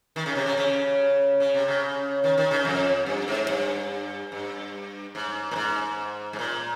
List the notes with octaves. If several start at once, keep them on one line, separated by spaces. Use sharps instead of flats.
D#3
C#3
C3
C#3
C#3
C#3
C3
C#3
D#3
D#3
C#3
F2
G2
G#2
G2
G2
G#2
A#2
G#2
G#2
A#2